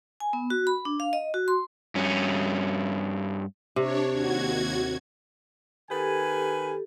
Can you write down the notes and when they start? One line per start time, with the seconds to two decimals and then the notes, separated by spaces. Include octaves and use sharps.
0.20 G#5
0.33 B3
0.50 F#4
0.67 B5
0.85 D4
1.00 F5
1.13 D#5
1.34 F#4
1.48 C6
1.95 G2 C#4
3.76 C3 D4 C#5
4.10 D#2 F#4 G#6
5.90 D#3 G4 A4 B4 G#5